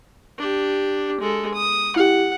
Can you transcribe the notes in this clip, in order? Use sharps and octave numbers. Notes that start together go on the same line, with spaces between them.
D4 G4
G#3 A4
D#6
E4 G4 F#5